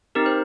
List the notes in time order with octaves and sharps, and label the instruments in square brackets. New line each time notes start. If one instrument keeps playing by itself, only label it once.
[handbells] C4 D#4 G4 A#4
C5